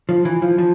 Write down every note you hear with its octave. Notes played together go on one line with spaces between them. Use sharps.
F3
E3
F3
F3